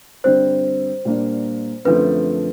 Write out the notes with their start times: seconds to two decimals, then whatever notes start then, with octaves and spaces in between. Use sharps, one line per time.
0.24 G2 D3 G3 C4 C5
1.05 A#2 G3 A#3 D4
1.85 F#2 D3 F3 A3 C4 B4